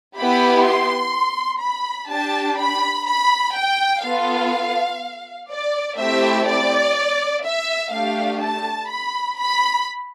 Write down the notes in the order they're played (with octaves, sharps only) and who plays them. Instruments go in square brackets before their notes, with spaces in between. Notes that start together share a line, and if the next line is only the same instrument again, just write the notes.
[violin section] B3 E4 G4 B5
C6
B5
D4 G4 A5
B5
B5
G5
B3 F4 A4 F5
D5
A3 C4 E4 G4 E5
D5
E5
A3 D4 G4 F5
A5
B5
B5